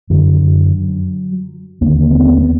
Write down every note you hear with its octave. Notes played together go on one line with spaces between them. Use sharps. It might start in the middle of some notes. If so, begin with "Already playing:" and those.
F#2 D3 F#3
D#2 D3 A#3
B3
C4
B3
B3